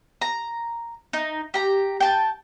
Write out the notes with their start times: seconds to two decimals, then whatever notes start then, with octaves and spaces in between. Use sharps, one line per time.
0.21 A#5
1.13 D#4
1.54 G4 A#5
2.00 G5 A5